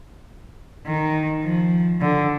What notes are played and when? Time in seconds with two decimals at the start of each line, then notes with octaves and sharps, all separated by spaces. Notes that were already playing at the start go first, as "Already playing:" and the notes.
0.87 D#3
1.43 F3
2.01 D3